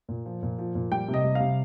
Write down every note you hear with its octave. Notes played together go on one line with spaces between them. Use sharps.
A#2
F3
A#2
F3
A#2
G3 G5
C3
D#5
G3
F5
C3